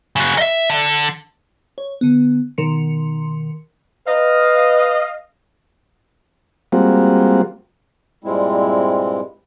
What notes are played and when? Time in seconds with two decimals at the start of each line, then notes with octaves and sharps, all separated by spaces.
0.16 C#3 F#4
0.38 D#5 E5
0.70 D3
1.78 C#5
2.01 D3 B3
2.58 B2 D#3 A#4 C6 C#7
4.08 B4 D#5 F5
6.72 G3 G#3 A#3 C4 F4 F#4
8.24 G2 A#2 G3 G#3 C4 E4